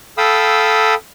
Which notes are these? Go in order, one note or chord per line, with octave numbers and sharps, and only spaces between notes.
A4 F5 G5 B5 D#6 E6